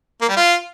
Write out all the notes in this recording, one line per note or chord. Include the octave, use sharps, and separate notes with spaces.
A#3
G3
F4